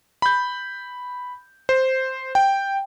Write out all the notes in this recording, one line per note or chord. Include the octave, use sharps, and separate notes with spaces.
B5 G6
C5
G5